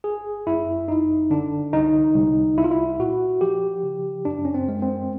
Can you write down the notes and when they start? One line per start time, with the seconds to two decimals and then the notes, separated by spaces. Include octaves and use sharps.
0.04 G1 G#4
0.46 F#2 E4
0.88 G1 D#4
1.30 D3 D4
1.73 C2 D#4
2.15 C2
2.57 C2 E4
2.64 F4
2.71 E4
2.99 A#2 F#4
3.41 F3 G4
3.83 C#3
4.25 F#2 D4
4.45 C#4
4.54 C4
4.68 G#3
4.82 C4